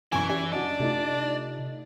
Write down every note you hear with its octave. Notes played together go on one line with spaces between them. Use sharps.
F#1 B1 E3 G#5 C#6
C#4 G4 D5 G#5
F#1 D4 F#4 D5 D#5
C3 A3 D#4 F4